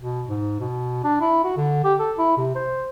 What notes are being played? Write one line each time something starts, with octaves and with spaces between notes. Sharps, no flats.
B2
G#2
B2
D4
E4
F#4
D3
G4
A4
E4
C3
C5